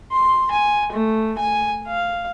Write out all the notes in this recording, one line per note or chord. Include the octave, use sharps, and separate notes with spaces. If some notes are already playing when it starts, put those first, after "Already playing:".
C6
G#5
A3
G#5
F5